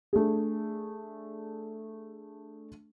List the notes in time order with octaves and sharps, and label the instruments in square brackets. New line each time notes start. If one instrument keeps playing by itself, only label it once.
[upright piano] A3 D4 G#4